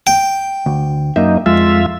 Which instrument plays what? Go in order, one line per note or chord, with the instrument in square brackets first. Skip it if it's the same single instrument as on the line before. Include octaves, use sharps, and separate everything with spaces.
[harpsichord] G5
[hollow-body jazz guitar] D2
[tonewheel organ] F#2 D#4 [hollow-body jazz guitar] A#3 E5
[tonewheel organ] F2 F4 E5 [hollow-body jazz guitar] G#3